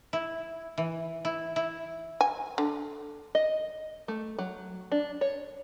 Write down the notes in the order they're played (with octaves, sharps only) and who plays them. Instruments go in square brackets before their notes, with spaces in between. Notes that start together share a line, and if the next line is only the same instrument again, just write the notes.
[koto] E4
E3
E4
E4
[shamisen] G#5
D3
[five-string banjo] D#5
A3
F#3
D4
C#5